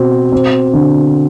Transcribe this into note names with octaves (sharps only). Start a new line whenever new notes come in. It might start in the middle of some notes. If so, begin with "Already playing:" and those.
Already playing: B2 C4
C4
D3